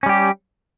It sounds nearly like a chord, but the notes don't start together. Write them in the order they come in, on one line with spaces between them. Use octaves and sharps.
C#4 G3 G4